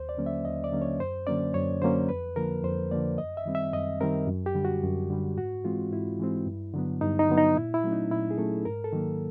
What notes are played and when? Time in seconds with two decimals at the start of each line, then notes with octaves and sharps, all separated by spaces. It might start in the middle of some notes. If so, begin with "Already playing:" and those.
Already playing: D#2 C5
0.09 D5
0.18 D3 F#3 A#3 C#4
0.26 E5
0.45 D#2 D#5
0.64 D5
0.72 D3 F#3 A#3 C#4
0.82 C#5
1.00 F#2 C5
1.27 D3 F#3 A#3 C#4 D5
1.54 F#2 C#5
1.82 D3 F#3 A#3 C#4 C5
2.09 F2 B4
2.36 D3 F3 A#3 A#4
2.63 F2 C5
2.91 D3 F3 A#3 D5
3.18 F#2 D#5
3.37 E5
3.46 D#3 G3 C4
3.55 E5
3.73 F#2 D#5
4.00 D#3 G3 C4 A#4
4.27 F#2
4.46 G4
4.55 D3 G3
4.65 F#4
4.83 F#2
5.10 D3 G3
5.38 G#2 F#4
5.65 E3 G#3 C4 F4
5.92 G#2 E4
6.20 E3 G#3 C4
6.46 G2
6.74 D3 F#3 B3
7.01 G2 D#4
7.19 D#4
7.29 D3 F#3 B3
7.38 D#4
7.56 A#2 E4
7.74 E4
7.84 F#3 A3 C#4
7.92 D#4
8.11 A#2 E4
8.31 G#4
8.38 F#3 A3 C#4 A4
8.65 G#2 A#4
8.84 A4
8.93 D#3 F#3 A#3